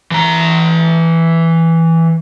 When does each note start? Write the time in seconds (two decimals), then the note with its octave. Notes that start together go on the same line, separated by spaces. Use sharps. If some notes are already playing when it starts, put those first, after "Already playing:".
0.11 E3 A#5